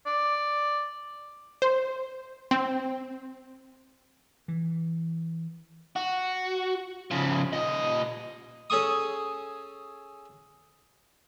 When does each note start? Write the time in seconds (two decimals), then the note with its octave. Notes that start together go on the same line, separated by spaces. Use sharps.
0.06 D5
1.62 C5
2.51 C4
4.48 E3
5.96 F#4
7.11 C#3 F3
7.53 A#2 D#5
8.70 C#4 G#4 A4 C#6 D#6